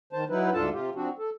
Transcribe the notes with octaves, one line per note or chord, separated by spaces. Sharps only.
D#3 C5 A5
F#3 D#4 E4 B4
D2 G#2 D4 F4 A4 A5
C3 F4 G4
F3 C4 D4 F#4
A4